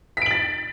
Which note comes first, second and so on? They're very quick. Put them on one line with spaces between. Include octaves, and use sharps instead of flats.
B6 D7 F#7 A6